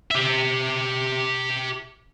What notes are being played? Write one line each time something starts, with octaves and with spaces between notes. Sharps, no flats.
G4 E5